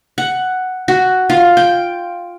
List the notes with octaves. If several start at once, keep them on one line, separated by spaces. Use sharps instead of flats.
F#5
F#4
F4
G5